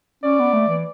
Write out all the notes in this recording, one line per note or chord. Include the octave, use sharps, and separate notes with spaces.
C#4 D5
B3
A3
E3